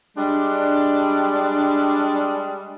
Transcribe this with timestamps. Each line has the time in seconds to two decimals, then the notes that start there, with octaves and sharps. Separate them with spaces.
0.17 G3 G#3 D4